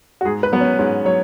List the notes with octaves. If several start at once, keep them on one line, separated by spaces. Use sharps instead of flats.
F#4
G#2 G#4
B4
F#3 B3
C#4
G#2 C#4
F#3 C#5